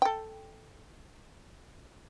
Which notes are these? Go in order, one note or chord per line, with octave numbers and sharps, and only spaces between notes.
A4 G5